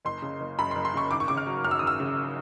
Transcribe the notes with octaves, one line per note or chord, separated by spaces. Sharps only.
F#1 C6
C#3
F#1
F#2 B5
C6
F#1
C6
C#3 C#6
G#1 D6
C#6
C#3 D6
F6
F#3
F#2 F6
E6
G#1 D#6
E6
C#3